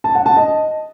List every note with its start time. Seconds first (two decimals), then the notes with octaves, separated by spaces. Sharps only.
0.04 A5
0.15 F#5
0.26 A5
0.36 D#5